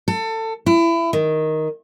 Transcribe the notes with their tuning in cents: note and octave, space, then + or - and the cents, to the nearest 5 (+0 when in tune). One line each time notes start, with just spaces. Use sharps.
A4 +25
E4 +25
D#3 +5